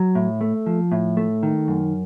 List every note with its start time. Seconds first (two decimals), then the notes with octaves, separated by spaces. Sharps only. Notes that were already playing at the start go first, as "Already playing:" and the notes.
Already playing: F#3
0.15 A2
0.41 A3
0.66 F3
0.92 A2
1.17 A3
1.43 D#3
1.68 F#2